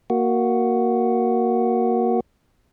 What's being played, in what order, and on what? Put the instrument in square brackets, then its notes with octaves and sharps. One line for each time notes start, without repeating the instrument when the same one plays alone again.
[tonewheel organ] A#3 F#4